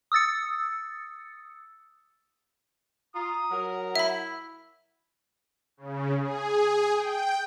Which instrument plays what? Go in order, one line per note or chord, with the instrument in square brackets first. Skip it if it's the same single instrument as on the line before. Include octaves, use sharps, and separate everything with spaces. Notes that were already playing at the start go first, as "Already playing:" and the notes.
[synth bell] D#6 E6 A6 C#7
[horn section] F4 [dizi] A#5 [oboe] D#6
[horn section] F#3 A#4 [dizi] F#5
[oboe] E4 [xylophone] E5 B5
[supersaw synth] C#3
G#4
G5